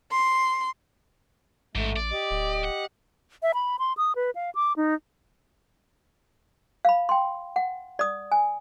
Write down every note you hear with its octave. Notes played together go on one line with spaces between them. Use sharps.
C6
A1 G#2 A3
D5
G4 D#5
D1
F#5
E5
B5
C6
D#6
B4
F5
D6
D#4
F5 B5
G5 C6
F#5
D5 D#6
G#5